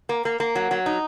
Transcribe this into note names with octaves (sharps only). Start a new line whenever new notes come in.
A#3
A#3
A#3
F#3
F#3
D#4